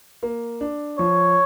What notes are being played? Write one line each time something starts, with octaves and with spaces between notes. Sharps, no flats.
A#3
D4
F3 C#5